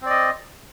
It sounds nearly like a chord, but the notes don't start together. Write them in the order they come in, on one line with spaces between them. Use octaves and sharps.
C4 D5 D#5